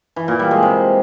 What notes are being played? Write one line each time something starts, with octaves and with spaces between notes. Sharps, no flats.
E3
A#2
G3
G#3
C3